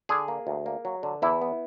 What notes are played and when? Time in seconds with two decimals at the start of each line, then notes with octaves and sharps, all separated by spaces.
0.09 D3 G#4
0.28 A#3
0.47 D2
0.66 A#3
0.85 F#3
1.03 D3
1.22 E2 E4
1.42 B3